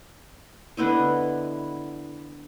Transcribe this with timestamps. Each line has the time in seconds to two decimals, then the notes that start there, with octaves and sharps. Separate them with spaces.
0.77 D3 B3 E4 D#5